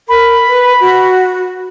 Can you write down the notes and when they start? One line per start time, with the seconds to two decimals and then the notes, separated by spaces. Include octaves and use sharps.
0.09 A#4 B5
0.48 B4
0.80 F#4